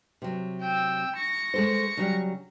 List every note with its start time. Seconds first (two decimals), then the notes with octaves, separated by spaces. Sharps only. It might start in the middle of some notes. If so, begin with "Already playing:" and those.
0.22 C3 F#3
0.62 G5 E6
1.16 C#6 A#6
1.54 G#3 A4 C5
1.97 C#3 F#3 G3